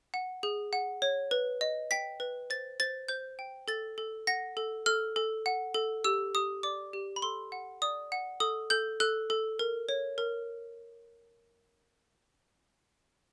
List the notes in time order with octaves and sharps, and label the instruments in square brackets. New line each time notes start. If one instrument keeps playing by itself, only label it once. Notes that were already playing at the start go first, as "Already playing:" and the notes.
[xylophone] F#5
G#4
F#5
C#5
B4
D#5
G5 B6
B4
C5 A6
C5 A6
C5 G6
G5
A4 A6
A4
F#5 A#6
A4
A4 F6
A4
F#5
A4
G4 E6
G4 D#6
D5 D6
G4
B5
A4 C6
F#5
D5 D#6
F#5
A4 D#6
A4 G6
A4 F#6
A4
A#4
C#5
A#4